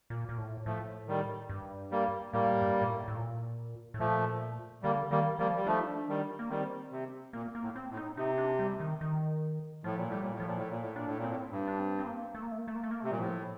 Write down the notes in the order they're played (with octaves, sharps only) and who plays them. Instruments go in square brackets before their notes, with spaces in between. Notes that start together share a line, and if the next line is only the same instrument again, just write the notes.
[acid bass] A#2
A#2
A2
[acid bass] A2 [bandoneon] F3 A3
[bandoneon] D#3 G3
[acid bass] G2
[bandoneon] G3 A#3
[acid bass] A2 [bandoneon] G3 A#3
[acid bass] G2
A#2
A2
A2
A#2
A2
[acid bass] A#2 [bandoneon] F3 A3
[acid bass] D3 [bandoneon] G3 A#3
[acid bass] D#3 [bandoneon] G3 A#3
[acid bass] F3 [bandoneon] G3 A#3
[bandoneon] G3
[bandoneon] F3 A3 [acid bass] D4
[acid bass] D#4
D4
[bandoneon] D#3 G3
[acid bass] A#3
[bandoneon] D#3 G3 [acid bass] C4
[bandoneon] C3
[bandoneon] A#2 [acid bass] A#3
[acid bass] A#3
[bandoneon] A2
[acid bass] C4
[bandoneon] A2
[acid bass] D#4
[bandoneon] C3 [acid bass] D#4
[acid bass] D4
G3
D#3
D#3
[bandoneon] A2 [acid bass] F3
[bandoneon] A#2
[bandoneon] A2 [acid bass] G3
[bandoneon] A#2
A2
[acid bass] F3
[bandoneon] A#2
A2
A#2
A2
[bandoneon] A#2 [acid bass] D4
[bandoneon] A2
A#2
[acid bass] C4
[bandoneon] A2
G2
[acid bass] D4
C4
C4
A#3
A3
A#3
A3
A#3
A3
A#3
A3
A#3
[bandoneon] C3 [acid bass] A3
[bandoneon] A#2 [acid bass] G3
[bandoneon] A2 [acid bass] F3